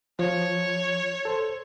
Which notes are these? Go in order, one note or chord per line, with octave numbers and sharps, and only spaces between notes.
F3 C#5
A4 C5